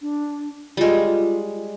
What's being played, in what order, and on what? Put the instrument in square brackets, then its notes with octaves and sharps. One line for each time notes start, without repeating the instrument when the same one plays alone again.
[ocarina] D4
[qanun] G3 G#3 [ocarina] F4